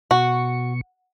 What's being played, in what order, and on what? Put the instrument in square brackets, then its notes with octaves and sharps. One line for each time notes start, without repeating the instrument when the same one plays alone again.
[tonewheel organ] B2 C#6 [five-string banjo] F#4